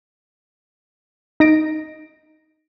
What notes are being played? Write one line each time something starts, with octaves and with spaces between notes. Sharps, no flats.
D#4 A#6 D7